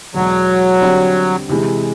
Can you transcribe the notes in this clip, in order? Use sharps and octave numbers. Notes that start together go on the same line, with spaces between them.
E2 B2 F#3 G#3
D3 G3 C4
C3 E3 G#3